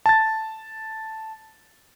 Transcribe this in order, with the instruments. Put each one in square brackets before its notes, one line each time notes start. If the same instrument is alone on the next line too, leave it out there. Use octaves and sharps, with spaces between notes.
[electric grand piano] A5 A6